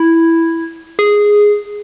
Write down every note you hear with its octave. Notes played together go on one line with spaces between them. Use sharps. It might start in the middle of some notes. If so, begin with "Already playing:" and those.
Already playing: E4
G#4